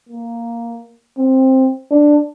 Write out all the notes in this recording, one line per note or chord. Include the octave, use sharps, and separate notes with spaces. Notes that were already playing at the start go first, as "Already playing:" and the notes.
A#3
C4
D4